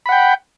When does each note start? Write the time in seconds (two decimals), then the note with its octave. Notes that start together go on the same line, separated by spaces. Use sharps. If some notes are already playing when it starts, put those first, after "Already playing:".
0.06 B5
0.09 F#5
0.12 G5